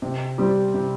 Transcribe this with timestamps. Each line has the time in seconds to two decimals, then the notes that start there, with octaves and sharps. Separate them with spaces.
0.02 C3
0.38 G3 C4 G4
0.74 C3